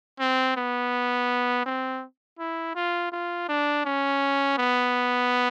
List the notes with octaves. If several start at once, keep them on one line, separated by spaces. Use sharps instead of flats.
C4
B3
C4
E4
F4
F4
D4
C#4
B3